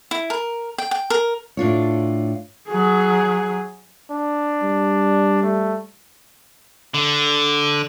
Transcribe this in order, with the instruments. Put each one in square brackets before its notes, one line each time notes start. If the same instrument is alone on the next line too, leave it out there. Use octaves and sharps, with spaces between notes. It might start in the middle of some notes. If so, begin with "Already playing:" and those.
[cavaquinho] E4
A#4
G5
G5
A#4
[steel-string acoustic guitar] A2 D4 F4 C#5
[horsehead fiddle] F#3 G#4
[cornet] D4
[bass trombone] G3
[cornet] A3
[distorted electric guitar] D3